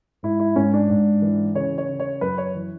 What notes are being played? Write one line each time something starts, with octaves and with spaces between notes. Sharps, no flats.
G#2 E4
E4
G#2 C#4
D4
G#2
E3
C#3 C#5
C#5
C#3
C#5
F#2 B4
C#5
E3